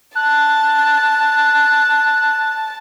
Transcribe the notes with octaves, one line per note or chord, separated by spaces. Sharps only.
A5 F#6